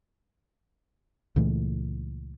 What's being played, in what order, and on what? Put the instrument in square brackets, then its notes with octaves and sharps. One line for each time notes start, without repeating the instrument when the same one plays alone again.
[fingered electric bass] C#2 A#2 E3 A3